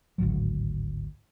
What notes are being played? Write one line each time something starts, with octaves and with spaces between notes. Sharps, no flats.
G#1 D2 A2 F#3